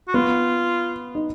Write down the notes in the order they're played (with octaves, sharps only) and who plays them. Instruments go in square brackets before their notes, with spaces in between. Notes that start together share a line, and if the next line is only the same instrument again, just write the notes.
[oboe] F#4
[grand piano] B3 [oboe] F4
[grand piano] D#4